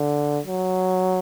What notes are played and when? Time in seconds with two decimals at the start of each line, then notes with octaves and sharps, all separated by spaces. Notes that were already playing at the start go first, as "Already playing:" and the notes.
Already playing: D3
0.47 F#3